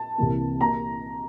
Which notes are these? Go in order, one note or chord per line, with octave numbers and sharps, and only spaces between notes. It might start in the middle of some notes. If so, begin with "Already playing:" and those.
Already playing: A5
C2 C3 E3 A#3
A#3 A#5